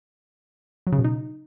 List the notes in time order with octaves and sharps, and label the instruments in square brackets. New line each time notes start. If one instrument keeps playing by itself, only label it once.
[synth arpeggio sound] F#3
C#3
B2
D#4